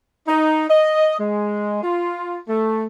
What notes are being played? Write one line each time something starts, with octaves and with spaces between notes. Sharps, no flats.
D#4
D#5
G#3
F4
A3